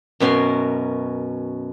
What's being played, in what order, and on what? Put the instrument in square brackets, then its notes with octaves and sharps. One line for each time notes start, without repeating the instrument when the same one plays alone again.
[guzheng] F#2 B2 C#4 A#4 C6